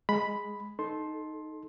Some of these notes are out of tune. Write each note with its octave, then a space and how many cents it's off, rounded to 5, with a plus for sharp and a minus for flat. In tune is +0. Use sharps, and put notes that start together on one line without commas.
G#3 +0 B5 +0
D#4 +0 A4 -15 C6 +15